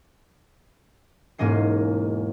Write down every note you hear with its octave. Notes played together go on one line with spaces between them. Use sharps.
E1 G#2 A#3 C#4 D#5 C7